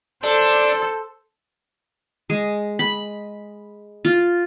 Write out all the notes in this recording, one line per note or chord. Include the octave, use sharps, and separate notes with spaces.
D4 A4 C5
G#3
B5
F4